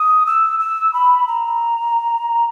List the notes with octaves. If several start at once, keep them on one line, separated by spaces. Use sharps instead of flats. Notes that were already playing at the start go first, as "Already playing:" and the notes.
Already playing: D#6
E6
E6
B5
A#5